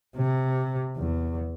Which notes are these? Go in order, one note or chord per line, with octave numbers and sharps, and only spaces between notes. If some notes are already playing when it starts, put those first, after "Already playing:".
C3
E2